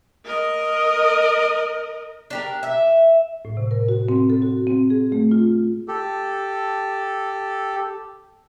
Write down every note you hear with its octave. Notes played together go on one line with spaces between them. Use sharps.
A#4 D#5
D4 G4 A#4
E5
A2
C3
A#4
F#4
C4
A4
F#4
C4
G#4
A3
F4
G4 A4